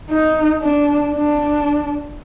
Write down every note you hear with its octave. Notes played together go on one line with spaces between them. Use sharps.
D#4
D4
D4